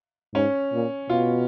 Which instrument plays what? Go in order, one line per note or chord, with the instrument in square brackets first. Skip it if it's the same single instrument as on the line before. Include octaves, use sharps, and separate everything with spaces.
[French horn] G#2 [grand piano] C#4
[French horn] A#2
[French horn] B2 [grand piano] F4